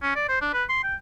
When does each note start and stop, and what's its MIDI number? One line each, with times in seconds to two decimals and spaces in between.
0.02 0.14 61
0.16 0.26 74
0.29 0.39 72
0.42 0.51 62
0.53 0.64 71
0.69 0.83 84
0.83 0.95 79